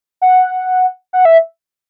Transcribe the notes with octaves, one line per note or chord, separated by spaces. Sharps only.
F#5
F#5
E5